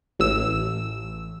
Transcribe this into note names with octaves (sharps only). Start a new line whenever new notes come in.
A1 E6